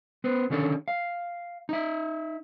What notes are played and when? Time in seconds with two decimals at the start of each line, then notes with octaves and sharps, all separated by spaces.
0.24 B3 B4 C5
0.50 D3 D#3 C#4 D4 A4 C#5
0.88 F5
1.69 D#4 E5